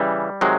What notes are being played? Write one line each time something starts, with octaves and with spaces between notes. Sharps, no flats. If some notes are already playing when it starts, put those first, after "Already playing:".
Already playing: C#3 E3 G3
C3 D#3 F#3 G#3